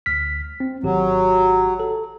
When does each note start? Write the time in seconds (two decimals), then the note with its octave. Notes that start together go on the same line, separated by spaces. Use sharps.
0.06 D2 F6 B6
0.60 C4
0.83 G#1 F#3 G4
1.80 A4